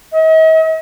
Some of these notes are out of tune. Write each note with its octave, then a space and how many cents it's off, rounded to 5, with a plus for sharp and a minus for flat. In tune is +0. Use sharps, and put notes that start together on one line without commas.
D#5 +45